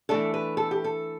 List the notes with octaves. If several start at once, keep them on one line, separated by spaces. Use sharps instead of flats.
E3 A3 D4 A4
B4
A4
G4
A4